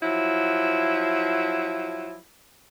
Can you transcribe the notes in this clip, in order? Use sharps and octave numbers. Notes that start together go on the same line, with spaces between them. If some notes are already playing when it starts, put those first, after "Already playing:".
F3 F#3 E4